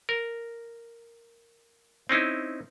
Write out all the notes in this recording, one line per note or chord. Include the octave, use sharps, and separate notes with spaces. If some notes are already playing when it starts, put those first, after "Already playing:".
A#4
C4 C#4 D#4 E4